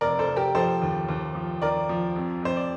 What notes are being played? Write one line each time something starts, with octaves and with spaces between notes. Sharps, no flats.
F1 A#4 D5
A4 C5
F1
G4 A#4
F3 A4 C5
D#2
D#2
F3
D#2 A#4 D5
F3
F2
F2 C5
D5